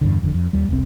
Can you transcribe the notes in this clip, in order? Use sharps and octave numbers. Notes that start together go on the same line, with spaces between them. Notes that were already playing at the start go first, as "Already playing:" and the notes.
E2 G2 B2 D3
F#1 F2 D3
F2
D#2 G3
E1 C2 C4